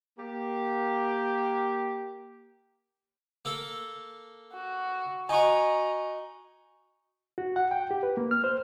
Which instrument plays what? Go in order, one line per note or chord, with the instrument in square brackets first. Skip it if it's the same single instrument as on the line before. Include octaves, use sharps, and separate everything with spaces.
[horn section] A#3 G4
[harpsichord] A#3 A4
[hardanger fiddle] F#4
[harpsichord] D#4 F#4 [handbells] G#5 C#6 [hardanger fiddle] A#5
[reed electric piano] F#4
F#5
G5
G4
B4
A#3
F6
C5